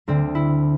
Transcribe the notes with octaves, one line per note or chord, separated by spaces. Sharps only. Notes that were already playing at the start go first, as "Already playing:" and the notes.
D2 D3 C4
E4